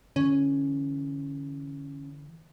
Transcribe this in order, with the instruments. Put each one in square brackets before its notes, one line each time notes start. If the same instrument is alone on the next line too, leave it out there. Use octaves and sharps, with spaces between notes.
[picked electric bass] D3 E3 [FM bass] C#4